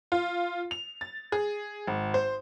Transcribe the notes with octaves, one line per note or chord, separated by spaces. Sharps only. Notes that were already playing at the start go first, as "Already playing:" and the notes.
F4
F7
A6
G#4
G#1
C5